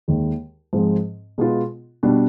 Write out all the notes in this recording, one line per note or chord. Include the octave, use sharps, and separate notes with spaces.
D#2 D#3 G#3
G#2 F3 G#3 C4
B2 G#3 B3 F4
B2 G3 D4